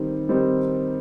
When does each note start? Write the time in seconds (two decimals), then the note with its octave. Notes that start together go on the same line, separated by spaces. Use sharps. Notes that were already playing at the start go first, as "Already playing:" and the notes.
Already playing: D#3 G3 C4 D#4
0.29 D#3 G3 C4 D#4